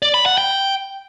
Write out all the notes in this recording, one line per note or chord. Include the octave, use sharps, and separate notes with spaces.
D5
B5
F#5
G5